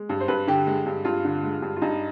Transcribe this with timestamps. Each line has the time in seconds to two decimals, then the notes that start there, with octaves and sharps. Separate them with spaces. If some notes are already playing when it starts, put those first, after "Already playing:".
Already playing: G#3
0.09 G2
0.20 C5
0.28 G2 B4
0.48 D3 G4
0.67 G#3
0.86 G2
1.05 G2 F4
1.25 D3
1.43 G#3
1.62 G2
1.76 F4
1.82 G2 D#4